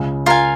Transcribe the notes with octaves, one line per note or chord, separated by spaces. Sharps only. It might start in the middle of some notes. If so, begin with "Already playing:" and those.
Already playing: C#2 C#3
F4 A#4 F5 G#5